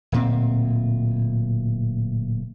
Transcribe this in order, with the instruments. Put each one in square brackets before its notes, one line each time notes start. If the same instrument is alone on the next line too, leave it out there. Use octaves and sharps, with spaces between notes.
[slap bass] D1 A#2 C4